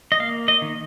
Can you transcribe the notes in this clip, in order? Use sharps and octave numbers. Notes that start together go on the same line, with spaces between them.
D#5
A#3 F5
D#5
D#3